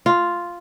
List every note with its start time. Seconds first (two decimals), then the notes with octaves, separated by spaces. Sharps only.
0.06 F4